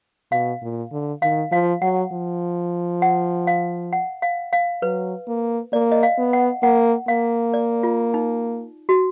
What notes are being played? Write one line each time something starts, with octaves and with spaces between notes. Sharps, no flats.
B2 F5
A#2
D3
D#3 F5
F3 F5
F#3 F#5
F3
F#5
F5
F#5
F5
F5
F#3 B4
A#3
A#3 D5
D#5
F5
B3
F#5
A#3 F#5
A#3 F5
D5
F4
D#4
F#4